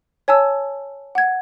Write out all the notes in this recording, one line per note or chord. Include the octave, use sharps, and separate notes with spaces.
C#5 G#5 A5 E6
F#5 G#6